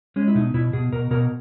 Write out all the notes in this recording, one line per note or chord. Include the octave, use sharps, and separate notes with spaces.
G#3 C#4
E4
B2 D#4
B2 E4
B2 G#4
B2 A#4
B2 A#4